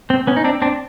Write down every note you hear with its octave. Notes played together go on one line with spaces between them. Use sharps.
C4
B3 C#4
D#4
C4 D4
C4 D4